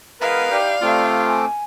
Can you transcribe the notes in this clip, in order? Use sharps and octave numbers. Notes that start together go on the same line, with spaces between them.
E3 G#3 B3 A#4 B4 F5
D#4 E4 G4 D5
C3 A3 C4 F4 D6
G#5